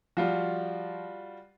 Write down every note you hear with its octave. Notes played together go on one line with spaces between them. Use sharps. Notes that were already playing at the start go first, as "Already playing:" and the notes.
F3 G3 F4 F#4